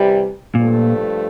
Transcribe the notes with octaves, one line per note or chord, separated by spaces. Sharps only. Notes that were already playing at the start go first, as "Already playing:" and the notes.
Already playing: C3 E3 G3
G2 A#2 F3 A3